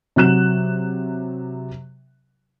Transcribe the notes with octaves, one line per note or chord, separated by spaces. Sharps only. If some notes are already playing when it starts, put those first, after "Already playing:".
C3 F#3 F#6 E7